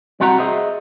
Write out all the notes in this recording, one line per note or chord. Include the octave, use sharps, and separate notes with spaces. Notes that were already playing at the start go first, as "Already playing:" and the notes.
C2 G3 C4 F#4 F#5 A#5
G#4 C5 D#5 E5